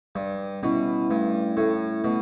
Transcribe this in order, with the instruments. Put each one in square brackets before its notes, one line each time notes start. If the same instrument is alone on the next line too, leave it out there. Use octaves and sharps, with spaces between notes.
[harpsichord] G2 [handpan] G3
[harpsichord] B2 [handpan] C#4 E4
[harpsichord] G2 [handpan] A3
[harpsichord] A2 [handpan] E4 A4
[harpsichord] B2 [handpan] A3